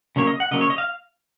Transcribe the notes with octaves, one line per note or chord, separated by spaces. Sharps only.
C#3 F#3 A#3 C#5
D#5
F#5
C#3 F#3 A#3 D#5
C#5
D#5
F5